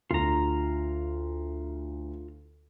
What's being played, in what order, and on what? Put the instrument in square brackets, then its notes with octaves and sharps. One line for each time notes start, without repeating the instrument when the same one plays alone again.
[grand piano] D2 [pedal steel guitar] F4 A#5